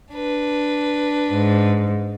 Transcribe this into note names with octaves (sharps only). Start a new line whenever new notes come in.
D4 B4
G#2